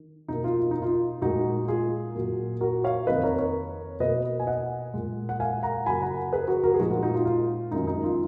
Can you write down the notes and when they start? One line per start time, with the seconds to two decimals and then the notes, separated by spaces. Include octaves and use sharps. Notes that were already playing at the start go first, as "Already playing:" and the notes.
Already playing: D#3
0.28 B2 A#3 D#4
0.44 F4
0.60 F4
0.71 D#4
0.82 F4
1.22 A#2 G#3 D#4 F#4
1.68 F4 G#4
2.14 A#2 F#3 A#3
2.61 F#4 A#4
2.84 C#5 F5
3.07 F2 D#3 A#3 B4 D#5
3.23 A#4 C#5
3.38 A#4 C#5
4.00 B2 A#3 B4 D#5
4.40 G#5
4.47 D#5 F#5
4.94 A#2 G#3
5.29 F#5
5.40 F5 G#5
5.63 F#5 A#5
5.86 F#2 C#3 F#3 A#3 G#5 B5
6.02 F#5 A#5
6.32 G#4 B4
6.48 F#4 A#4
6.63 F#4 A#4
6.74 G#4
6.79 A#2 F3 G#3 D#4 F#4
6.91 F4
7.03 D#4 F#4
7.15 F4
7.26 F4
7.71 F#2 D#3 G#3 D#4
7.87 D#4
8.04 F4